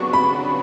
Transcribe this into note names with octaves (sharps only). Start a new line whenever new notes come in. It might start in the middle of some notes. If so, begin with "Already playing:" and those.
Already playing: C#3 F#3 B3 D4 F#4 C#6
B5